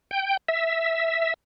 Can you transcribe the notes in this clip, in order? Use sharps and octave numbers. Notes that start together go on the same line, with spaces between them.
G5
E5